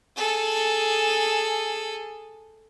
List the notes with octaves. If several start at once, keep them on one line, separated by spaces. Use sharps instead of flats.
G#4 A4